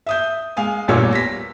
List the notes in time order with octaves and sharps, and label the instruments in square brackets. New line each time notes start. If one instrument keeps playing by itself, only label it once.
[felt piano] E5 D#6 G6
G#3 F5 G#5 D#6
A1 E2 A#2 G3 C#5 E6
A#6 B6